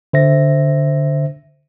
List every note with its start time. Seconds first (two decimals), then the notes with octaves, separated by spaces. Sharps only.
0.13 D3 C5 E5 A#6